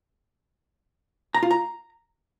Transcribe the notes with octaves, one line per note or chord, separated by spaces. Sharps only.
A#5
F4
A#5